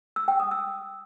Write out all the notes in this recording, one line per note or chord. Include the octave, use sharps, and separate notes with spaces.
E6
G5
D#6
E6